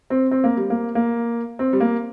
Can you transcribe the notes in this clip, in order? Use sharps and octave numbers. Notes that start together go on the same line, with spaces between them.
C4
C4
A#3
G3
A#3
A#3
C4
G3
A#3